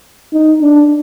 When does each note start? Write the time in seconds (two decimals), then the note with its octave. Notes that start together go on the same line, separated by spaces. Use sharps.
0.33 D#4
0.61 D4